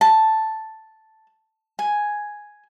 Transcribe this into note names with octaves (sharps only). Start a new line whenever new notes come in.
A5
G#5